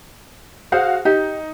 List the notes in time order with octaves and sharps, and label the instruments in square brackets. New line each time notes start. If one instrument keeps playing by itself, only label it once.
[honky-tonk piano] F#4 F5 [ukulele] G#4 C5 F#5
[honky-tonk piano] D#4 [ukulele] G4